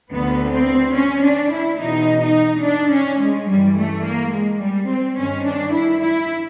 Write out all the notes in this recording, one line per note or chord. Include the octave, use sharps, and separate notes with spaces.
D2 D3 B3
C4
C#4
D4
E4
E2 B2 D#4
D#4
D4
C#4
G#3
G2 E3 G3
A3
A#3
G#3
G3
C4
G2 D#3 C#4
D4
E4
E4